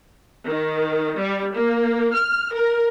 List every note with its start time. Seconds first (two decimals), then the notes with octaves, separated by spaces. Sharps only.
0.46 D#3
1.18 G3
1.53 A#3
2.13 F6
2.52 A#4